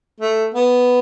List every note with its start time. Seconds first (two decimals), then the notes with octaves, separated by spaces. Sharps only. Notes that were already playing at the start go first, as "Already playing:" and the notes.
0.21 A3
0.54 B3